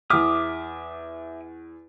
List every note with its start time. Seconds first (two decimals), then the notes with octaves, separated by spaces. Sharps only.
0.10 E2 E5 D6 D#6 F6